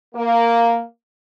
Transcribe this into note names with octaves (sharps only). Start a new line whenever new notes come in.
A#3